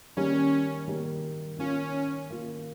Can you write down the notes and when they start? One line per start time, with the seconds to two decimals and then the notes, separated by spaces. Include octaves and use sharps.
0.17 D#3 G3 A#3 C#4
0.88 D#3 G3 A#3
1.58 D#3 A#3 C#4 F4
2.30 D#3 A#3 F4